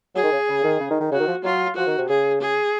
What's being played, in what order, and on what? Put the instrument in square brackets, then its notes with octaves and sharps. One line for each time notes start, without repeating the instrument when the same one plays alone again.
[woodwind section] F#3 [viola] G#4
[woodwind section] D#3
C#3
C#3
D#3
C#3
D#3
D#3
[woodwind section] C#3 [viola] F#4
[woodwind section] D#3
F3
[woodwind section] F#3 [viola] F4
[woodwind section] F3 [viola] F#4
[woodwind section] D#3
C3
[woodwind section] C#3 [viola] G#4
[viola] G#4